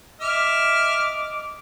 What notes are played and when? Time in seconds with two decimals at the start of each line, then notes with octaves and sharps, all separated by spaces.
0.21 D#5 E5 D6 F6